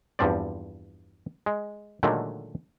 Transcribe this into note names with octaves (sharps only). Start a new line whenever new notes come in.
E2 G2 F3 C4 D5
G#3
A#2 D3 D#3 F#3 G#3 A3